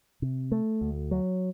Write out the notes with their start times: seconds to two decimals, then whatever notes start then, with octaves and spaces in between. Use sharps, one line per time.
0.22 C3
0.52 A3
0.81 D2
1.11 F#3